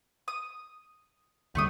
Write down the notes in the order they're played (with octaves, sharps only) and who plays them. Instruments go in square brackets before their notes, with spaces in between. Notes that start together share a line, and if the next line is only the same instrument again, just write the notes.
[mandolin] D#6
[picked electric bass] D#2 D3 G3 [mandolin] A3 C#6 D#6